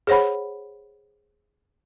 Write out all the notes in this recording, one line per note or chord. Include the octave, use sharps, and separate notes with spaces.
G#4 C5 C#5 F#5 B5